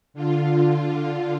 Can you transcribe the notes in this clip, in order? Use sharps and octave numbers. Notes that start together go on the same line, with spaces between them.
D3 F4